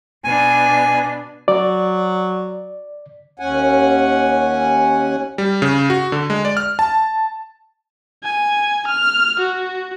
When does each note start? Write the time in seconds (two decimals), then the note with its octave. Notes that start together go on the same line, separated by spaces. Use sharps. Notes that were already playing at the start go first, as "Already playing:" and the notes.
0.24 B2 D4 G#5
1.48 F#3 D5
3.39 D#2 C#4 F#5 G#5
5.38 G3
5.62 C#3
5.90 F#4
6.12 D3
6.30 G#3
6.45 D5
6.57 F6
6.79 A5
8.24 G#5
8.88 F6
9.40 F#4